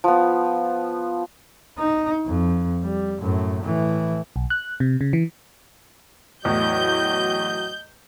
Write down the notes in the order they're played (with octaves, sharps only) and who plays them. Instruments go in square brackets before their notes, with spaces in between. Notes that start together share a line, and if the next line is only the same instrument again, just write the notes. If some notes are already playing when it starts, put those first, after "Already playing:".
[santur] F3 B3
[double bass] D#4
F2
G3
F#2 A2
A2 E3
[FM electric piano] B1
F#6
C3
C#3
E3
[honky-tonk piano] E2 A2 [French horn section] F#3 F#4 [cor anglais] D#5 [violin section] G6